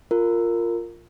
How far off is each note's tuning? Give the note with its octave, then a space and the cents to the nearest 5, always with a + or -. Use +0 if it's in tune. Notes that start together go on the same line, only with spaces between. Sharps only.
F4 +0 A#4 -15